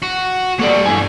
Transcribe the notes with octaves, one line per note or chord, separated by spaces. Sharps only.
F#4
G3 A#3 A4 C#5 D5
B1 G2 E4 G#5